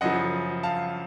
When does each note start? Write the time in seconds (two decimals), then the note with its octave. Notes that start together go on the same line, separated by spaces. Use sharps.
0.01 F#2 C#3 F3 D#5 F#5
0.63 F5 A5